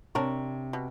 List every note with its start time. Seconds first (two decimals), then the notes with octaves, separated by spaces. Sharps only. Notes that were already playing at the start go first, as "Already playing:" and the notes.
0.15 C3 D4 A#4 C#5
0.73 B2